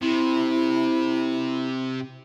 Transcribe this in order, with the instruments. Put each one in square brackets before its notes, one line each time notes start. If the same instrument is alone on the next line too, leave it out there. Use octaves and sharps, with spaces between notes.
[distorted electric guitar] C3 [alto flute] E4